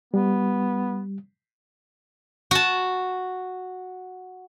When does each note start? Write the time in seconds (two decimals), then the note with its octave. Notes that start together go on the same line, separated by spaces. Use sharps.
0.14 G3 B3
2.51 F#4 A5